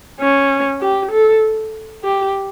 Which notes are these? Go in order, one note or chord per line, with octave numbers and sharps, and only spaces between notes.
C#4
G4
A4
G4